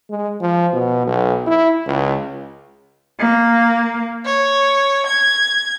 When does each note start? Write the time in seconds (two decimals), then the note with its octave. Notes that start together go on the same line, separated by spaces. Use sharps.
0.10 G#3
0.41 F3
0.73 B2
1.07 B1
1.47 E4
1.86 C#2
3.19 A#3
4.25 C#5
5.06 G#6